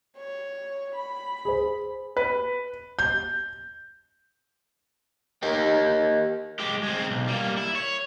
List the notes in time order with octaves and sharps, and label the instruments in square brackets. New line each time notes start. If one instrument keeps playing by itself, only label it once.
[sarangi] C#5
B5
[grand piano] G#4 C5
[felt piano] B4
G6
[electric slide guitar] G4 A#4 D#5 G5
[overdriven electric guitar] G#3 G4
G#3 C4
B1
G3 A#3
E4
C#5